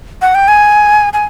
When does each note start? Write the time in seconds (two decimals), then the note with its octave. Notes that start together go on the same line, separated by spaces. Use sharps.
0.22 F#5
0.35 G5
0.48 G#5
1.13 G#5